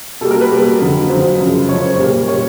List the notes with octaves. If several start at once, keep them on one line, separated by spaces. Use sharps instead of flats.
B2 G3 A#3 A4
A#4
B4
B2 G3 A#3
F2 D3 F#3
F2 D3 F#3 C5
F#2 C#3 F3 G#3
F#2 C#3 F3 G#3 C#5
C5
A#2 G3 A#3
A#2 G3 A#3 C#5